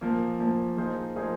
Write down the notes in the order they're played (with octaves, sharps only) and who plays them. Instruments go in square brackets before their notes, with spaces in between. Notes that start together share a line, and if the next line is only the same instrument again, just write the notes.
[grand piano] A#2 F3 A#3
A#2 F3 A#3
F3 A#3 D#4 G#4 C5
F3 A#3 D#4 G#4 C5